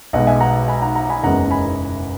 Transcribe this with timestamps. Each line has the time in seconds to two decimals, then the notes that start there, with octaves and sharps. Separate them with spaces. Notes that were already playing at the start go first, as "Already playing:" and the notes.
0.13 B1 B2 G#3 D#5 F#5
0.27 E5 G#5
0.40 F#5 A#5
0.68 G#5 B5
0.82 F#5 A#5
0.95 F#5 A#5
1.09 G#5 B5
1.23 F#1 E2 D#3 G#3 C#4 F#5 A#5
1.50 G#5 B5